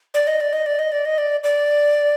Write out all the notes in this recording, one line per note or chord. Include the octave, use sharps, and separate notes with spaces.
D5
D#5
D5
D#5
D5
D#5
D5
D#5
D5
D5